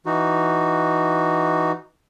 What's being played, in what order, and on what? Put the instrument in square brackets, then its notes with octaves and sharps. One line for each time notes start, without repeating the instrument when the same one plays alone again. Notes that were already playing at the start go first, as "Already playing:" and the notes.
[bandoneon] E3 D#4 F#4